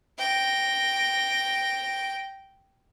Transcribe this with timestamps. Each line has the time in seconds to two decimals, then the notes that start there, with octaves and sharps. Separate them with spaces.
0.18 G5 A#6